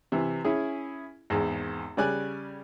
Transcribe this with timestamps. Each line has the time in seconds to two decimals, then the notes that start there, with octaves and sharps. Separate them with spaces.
0.12 C3 E3
0.44 C#4 E4 G#4
1.30 G#1 E2
1.97 C#3 G3 D5 G#5 F#6